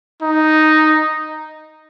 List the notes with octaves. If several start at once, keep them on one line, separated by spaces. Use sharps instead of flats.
D#4